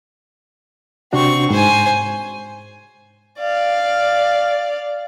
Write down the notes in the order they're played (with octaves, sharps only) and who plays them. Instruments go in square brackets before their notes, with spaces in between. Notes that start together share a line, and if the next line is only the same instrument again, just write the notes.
[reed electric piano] C3 D4 F#4 [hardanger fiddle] C4 C#6
[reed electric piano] G#2 [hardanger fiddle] C5 G#5
[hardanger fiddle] D5 F5